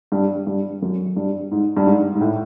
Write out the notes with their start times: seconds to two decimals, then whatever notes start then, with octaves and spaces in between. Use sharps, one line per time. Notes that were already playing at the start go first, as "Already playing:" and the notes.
0.12 G2
0.47 G2
0.82 F#2
1.16 G2
1.51 G#2
1.77 G2
1.86 G#2
2.15 G#2
2.21 A2